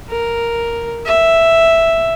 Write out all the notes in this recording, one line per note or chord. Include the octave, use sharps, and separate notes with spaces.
A#4
E5